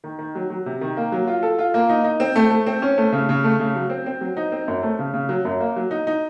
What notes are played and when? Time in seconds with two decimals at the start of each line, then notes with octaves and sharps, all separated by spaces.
0.04 D#3
0.19 D#3
0.35 F#3
0.50 F#3
0.66 C3
0.81 D#3
0.97 A#3
1.12 F#3
1.27 F4
1.43 A4
1.59 F4
1.74 A#3
1.89 D#4
2.04 D#4
2.20 C4
2.36 A3
2.50 A3
2.67 C4
2.82 C#4
2.98 A3
3.12 C#3
3.29 C#3
3.44 A3
3.60 C#3
3.75 F#3
3.90 C4
4.06 C4
4.21 F#3
4.37 D#4
4.52 C4
4.68 F#2
4.83 A3
4.99 C#3
5.14 C#3
5.29 F#3
5.45 F#2
5.60 A#3
5.76 F#3
5.91 D#4
6.07 D#4